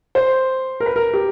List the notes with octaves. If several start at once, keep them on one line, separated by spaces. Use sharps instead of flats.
C5
A#4
B4
A#4
G4